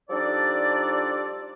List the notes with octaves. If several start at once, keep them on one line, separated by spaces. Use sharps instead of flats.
F3 G3 D4 D#4 A4 D5